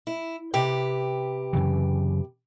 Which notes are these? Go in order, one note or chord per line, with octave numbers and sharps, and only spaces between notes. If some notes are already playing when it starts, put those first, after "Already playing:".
E4
C3 G4 B4
F#2 C#3 E3